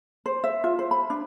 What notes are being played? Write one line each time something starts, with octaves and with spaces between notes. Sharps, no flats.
C5
E5
F4
C5
B5
D4